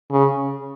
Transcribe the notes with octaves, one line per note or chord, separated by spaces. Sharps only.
C#3